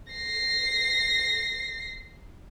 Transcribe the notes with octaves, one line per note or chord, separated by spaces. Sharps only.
A#6 C7